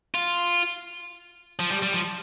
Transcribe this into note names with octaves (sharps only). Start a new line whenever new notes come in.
F4
F3
G3
G3
F3